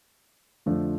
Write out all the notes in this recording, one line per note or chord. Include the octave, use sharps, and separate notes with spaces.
F2 D3 F3 A3 D4